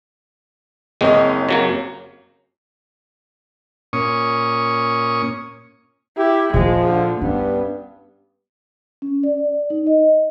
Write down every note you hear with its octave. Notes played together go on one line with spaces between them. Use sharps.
F#1 G#3 C4 C#4 D#5
C#3 F#3 A#3
A#2 C#4 C#6 D#6
E4 G4
A#2 F3 G#3 A#3
D3
G2 B3 C#4
C#4
D5
D#4
D#5